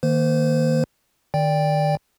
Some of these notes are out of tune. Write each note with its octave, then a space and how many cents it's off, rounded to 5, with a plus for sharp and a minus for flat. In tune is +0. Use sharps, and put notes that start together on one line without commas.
D#3 +0 A#3 +0 C5 -25
D#3 -30 D5 -10 G5 +10